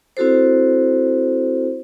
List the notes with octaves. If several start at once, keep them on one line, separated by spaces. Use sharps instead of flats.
C4 E4 F#4 A4 C5